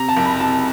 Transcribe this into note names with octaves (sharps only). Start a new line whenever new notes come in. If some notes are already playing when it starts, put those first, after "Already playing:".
Already playing: C3 A#5
A5
F#1
B5
C3 A5